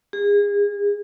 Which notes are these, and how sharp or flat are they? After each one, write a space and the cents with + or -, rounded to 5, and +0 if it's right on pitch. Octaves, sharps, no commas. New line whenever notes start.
G#4 -30